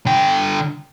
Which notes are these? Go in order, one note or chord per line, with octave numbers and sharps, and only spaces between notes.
D3 G5